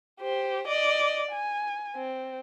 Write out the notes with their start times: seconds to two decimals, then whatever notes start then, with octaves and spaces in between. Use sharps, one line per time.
0.21 G4 C5
0.68 D5 D#5
1.31 G#5
1.96 C4